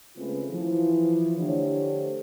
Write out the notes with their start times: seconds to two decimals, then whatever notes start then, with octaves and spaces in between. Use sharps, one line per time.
0.17 C#3 G#3 A3 C4 F4 B4
0.50 E3 F3
1.38 D3 A3 D4 G4 C5 C#5